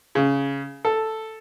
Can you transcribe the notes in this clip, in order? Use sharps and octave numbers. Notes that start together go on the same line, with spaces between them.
C#3
A4